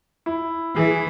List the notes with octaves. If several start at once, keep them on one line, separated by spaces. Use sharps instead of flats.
E4
E3 G#4